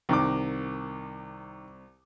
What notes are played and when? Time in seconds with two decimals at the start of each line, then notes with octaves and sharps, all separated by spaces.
0.09 C2 D#3 D6